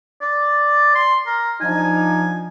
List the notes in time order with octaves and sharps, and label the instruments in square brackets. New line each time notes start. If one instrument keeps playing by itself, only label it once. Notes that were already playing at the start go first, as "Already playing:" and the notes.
[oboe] D5
C6
A#4
[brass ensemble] F3 D4 D#4 [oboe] G#5